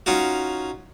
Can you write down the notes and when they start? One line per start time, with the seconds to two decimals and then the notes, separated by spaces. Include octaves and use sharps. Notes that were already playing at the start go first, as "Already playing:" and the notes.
0.06 C#4 D#4 F4 F#4